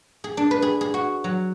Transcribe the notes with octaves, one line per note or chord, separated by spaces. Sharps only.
G#4
D4
B4
G#4
G#4
F#4
F#3